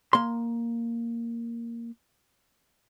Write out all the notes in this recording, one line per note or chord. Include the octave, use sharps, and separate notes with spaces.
A#3 C6